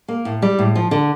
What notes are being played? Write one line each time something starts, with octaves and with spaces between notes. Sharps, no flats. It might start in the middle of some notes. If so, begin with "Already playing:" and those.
A#3
A2
G3
A2
F3
D3